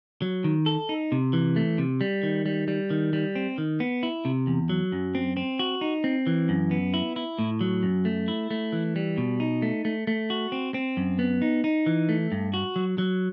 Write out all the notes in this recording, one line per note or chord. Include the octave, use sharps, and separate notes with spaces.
F#3
D#3
A4
D#4
C3
E3
A3
C3
G3
D#3
G3
G3
D#3
G3
C4
D#3
B3
E4
C3
E2
F#3
F#2
C4
C4
F#4
D#4
C4
E3
F#2
B3
E4
E4
A2
F#3
F#2
A3
E4
A3
E3
G3
B2
D#4
A3
A3
A3
F#4
C4
C4
F#2
B3
D#4
D#4
E3
A3
G2
F#4
F#3
F#3